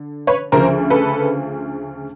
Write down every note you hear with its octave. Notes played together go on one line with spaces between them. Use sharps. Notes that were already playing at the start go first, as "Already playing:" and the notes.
Already playing: D3
B4 C#5
D2 C#3 F3 A#4 C5
A4 B4